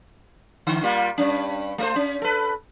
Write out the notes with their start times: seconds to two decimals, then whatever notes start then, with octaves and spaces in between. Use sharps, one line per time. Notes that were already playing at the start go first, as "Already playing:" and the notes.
0.67 D3
0.83 G3 A#3 F4
1.18 G2 C#4
1.78 A3 A#4 C5
1.96 C#4
2.22 A4 B4